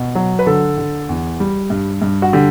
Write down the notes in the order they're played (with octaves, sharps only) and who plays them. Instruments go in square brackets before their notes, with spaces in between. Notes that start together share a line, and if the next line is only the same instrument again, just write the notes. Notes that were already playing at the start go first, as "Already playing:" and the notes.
Already playing: [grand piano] B2
F#3
B4
D3 A4
D3
E2
G3
G2
G2
F#4
D3 G4